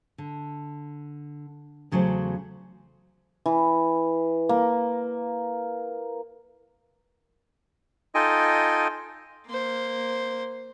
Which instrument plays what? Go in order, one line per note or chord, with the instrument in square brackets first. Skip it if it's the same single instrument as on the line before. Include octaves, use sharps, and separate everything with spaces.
[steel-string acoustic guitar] D3
E2 C#3 F#3 A3 B4 C5
[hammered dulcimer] E3
A#3
[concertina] D#4 F4 A4 D#5 G5 G#5
[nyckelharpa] A#3 C5